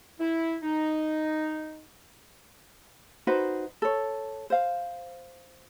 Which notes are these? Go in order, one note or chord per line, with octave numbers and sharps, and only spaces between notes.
E4
D#4
D#4 F#4 B4 C5
A4 C#5
C5 F5